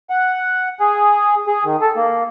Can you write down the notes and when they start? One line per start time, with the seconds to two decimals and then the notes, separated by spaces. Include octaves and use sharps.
0.10 F#5
0.80 G#4
1.47 G#4
1.65 D#3
1.81 A4
1.97 A#3